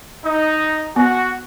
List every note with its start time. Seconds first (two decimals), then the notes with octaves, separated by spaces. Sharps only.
0.25 D#4
0.96 B3 F#4